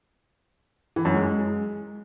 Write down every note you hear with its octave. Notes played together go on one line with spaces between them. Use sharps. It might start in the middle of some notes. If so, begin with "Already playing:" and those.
E3
F#2
G#3